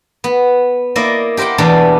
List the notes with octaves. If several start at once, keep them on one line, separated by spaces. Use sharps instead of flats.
B3
A#3 E4 D5 D#5
G4 A#4 C5 F#5 G5
E2 B2 E3 B3 D4 D5